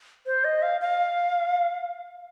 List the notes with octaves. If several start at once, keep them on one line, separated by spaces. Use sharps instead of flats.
C5
D#5
F5
F5